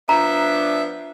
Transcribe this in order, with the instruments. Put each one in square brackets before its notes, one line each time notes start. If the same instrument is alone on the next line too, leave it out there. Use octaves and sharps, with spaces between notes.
[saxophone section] F3 B3 D4 [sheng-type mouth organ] E5 [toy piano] A#5